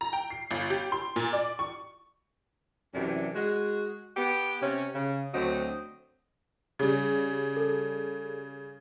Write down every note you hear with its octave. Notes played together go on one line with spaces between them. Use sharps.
A#5
G5
C7
G1
G4
C6
A#2
D5
C#6
F#2 C3 E3 D4
G#3 F#4
B3 G4
C3 C#4
C#3
D2 F#3 C4 D#5
C#3 G3
A4